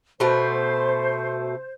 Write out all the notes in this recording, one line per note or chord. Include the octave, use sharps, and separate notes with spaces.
B2 A3 C5